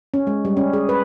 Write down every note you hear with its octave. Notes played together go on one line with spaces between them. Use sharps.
C#4
G#3
G3
C#4
G#4
B4